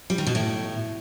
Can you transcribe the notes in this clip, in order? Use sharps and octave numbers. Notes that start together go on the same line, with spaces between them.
G3
D#3
B2
A2